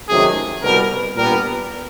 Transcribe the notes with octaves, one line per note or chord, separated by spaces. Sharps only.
C#2 C3 D#3 F#3 A3 G#4
C2 B2 G3 B3 A#4
A#2 G3 B3 D4 A#4